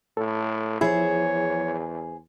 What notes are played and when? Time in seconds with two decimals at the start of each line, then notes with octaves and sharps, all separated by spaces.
0.17 A2 A4
0.81 E2 F3 E4 G#4 C5 C#5